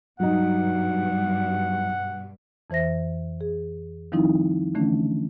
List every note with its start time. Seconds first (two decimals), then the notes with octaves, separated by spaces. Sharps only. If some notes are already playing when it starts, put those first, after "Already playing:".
0.20 G2 B2 F#3 D#4 F#5
2.70 F2 E3 C5 E5 A#6
3.41 G#4
4.12 D#3 F3 G3 C4 D#4 E4
4.75 D3 E3 A3 C#4 D4